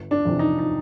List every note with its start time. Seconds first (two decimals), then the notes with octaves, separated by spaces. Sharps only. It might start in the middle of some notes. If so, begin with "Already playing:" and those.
Already playing: G1
0.11 D4
0.25 F2 C3 E3
0.39 D#4
0.59 D#4